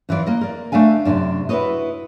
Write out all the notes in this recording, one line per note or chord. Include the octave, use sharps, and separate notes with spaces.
F2 E3 F4 D5 F5
A#3 D#5
A#4 D5
A3 D4 E5 F5 G#5
F#2 C3 E3 C#4 D4
E4 F#4 A4 B4 C#5 D#5